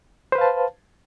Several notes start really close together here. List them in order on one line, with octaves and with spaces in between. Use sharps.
C5 B4 F5 A5